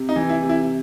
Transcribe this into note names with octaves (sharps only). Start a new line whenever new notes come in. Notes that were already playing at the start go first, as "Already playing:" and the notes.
Already playing: C3
D#4
E3
E4
C3
E4